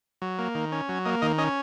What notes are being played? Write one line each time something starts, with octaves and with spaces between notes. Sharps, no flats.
F#3
A#3
D#3
C#4
F#3
A#3 D#5
D#3 D#5
C#4 D#5